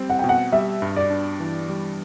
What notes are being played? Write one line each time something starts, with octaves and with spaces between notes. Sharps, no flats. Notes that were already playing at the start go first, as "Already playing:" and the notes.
Already playing: G3 C4
F#5
B2 G5
F#5
G3 E5
G2
D5
D4
E3
G3